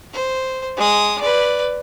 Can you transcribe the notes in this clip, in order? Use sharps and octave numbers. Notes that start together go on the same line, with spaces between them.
C5
G#3 D#6
B4 D5